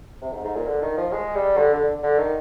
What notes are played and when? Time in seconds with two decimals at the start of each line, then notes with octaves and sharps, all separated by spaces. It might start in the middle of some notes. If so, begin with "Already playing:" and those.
0.21 C3
0.33 G#2
0.45 G#2
0.55 A#2
0.67 D3
0.82 D#3
0.97 F3
1.12 G#3
1.35 G3
1.57 D3
1.73 D3
2.03 D3
2.18 D#3